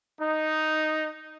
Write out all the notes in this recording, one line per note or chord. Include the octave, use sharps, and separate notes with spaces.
D#4